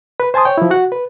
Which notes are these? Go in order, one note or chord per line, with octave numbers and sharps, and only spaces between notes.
B4
C5 G#5 A5 C6 D#6
C#5 G5
F3 E4
F#4 F#5
B4